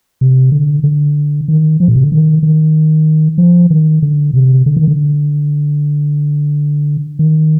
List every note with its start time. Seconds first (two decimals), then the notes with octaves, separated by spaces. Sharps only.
0.21 C3
0.52 D3
0.84 D3
1.48 D#3
1.80 F3
1.88 A#2
1.96 C3
2.03 D3
2.12 D#3
2.43 D#3
3.38 F3
3.70 D#3
4.02 D3
4.34 C3
4.66 D3
4.77 D#3
4.88 D3
7.19 D#3